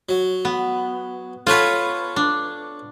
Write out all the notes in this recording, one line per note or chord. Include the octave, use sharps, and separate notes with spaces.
F#3
B3
F4 A4 B4 C#5 F#5
D4